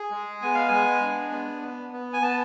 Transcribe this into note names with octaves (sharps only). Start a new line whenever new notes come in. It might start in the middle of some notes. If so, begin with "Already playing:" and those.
Already playing: G#4
G#3
B3 G#5
F5
G#3 G#5
D4
B3
B3
B3
G#5
B3 A5